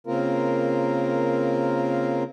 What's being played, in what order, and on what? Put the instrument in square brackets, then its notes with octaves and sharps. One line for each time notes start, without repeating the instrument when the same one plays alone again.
[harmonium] C#3 A#3 C4 F4 A#4